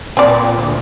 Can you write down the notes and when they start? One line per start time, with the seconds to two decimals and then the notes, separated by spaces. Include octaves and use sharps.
0.17 A#2 C4 D5
0.58 D2